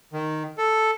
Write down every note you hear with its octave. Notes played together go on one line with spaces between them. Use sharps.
D#3
A4